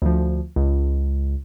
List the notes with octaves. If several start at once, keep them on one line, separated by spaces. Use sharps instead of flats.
D2 F3
C#2